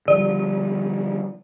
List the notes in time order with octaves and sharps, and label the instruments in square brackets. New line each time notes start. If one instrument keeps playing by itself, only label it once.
[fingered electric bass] D3 F3 G3 [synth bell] D5